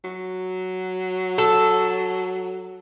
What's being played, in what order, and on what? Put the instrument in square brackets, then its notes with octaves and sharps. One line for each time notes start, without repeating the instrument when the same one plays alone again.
[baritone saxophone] F#3
[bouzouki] A4